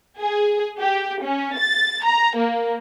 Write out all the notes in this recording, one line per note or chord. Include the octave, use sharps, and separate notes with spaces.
G#4
G4
C#4
A6
A#5
A#3